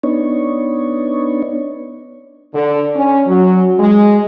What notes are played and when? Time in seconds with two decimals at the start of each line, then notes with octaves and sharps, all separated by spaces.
0.03 B3 D4 D#4 C#5
2.54 D3
2.95 C#4
3.27 F#3
3.79 G#3